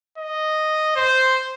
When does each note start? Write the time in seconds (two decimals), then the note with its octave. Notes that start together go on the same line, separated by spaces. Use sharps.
0.18 D#5
0.96 C5